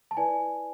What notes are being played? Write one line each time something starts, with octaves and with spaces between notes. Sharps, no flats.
A5
E4 B4 D5 G#5